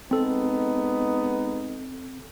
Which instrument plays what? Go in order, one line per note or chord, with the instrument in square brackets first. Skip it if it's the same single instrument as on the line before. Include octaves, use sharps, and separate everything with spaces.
[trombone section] G#3 B3 D#4 [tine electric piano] C4 A4